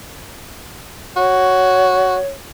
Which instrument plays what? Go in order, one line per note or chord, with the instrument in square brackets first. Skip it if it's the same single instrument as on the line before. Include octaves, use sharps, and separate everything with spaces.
[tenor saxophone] F#4 [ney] C#5